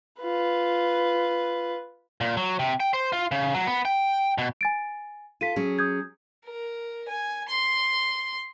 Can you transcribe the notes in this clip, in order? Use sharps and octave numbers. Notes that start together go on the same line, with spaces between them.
F4 B4
A#2
F#3
C3
G5
C5
F4
C#3
F#3
B3
G5
B2
G#5 A6 D7
F4 A4 B6 D#7
F#3 C#4 G#4
D#6 G6 G#6
A#4
G#5
C6